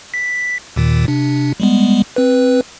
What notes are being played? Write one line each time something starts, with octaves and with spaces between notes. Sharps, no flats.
B6
D#2 A#2 D#3
C3 D4
G3 G#3 B3
C4 B4